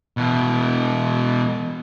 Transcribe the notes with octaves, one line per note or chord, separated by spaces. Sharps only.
B2 E3